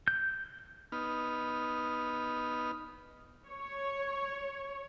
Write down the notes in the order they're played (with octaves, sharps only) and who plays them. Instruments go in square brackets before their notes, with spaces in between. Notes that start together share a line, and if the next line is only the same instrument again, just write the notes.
[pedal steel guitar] G6
[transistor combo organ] B3 D#4 F6
[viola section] C#5